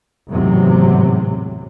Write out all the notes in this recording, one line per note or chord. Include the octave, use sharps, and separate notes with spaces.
G#1 E2 A2 C3 F#3